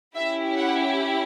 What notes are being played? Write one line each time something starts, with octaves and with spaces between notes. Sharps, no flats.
C#4 E4 G4 E5
F#5